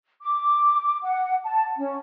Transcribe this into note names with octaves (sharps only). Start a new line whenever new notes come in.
D6
F#5
A5
C#4